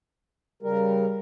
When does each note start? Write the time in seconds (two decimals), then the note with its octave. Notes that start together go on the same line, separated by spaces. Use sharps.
0.63 C#3 G3 A#4